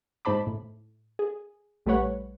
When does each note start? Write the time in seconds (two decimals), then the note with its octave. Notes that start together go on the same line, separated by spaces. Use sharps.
0.25 G#2 D#4 C5 A5 B5 D6
0.47 A2
1.19 G#4
1.86 A#1 G3 A3 B4 C#5 F#5